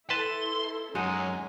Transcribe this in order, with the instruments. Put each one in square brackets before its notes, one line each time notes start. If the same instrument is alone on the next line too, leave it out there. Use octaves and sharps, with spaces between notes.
[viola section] E4 A4 [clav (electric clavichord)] B4 A5 [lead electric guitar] C6
[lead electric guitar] F#2 [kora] G#3 D#4 F#5 [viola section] C#4 G#5